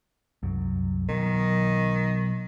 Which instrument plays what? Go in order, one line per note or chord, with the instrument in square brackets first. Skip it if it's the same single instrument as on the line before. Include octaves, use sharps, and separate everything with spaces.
[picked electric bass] C2 F#2
[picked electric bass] B2 F#3 [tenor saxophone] D#3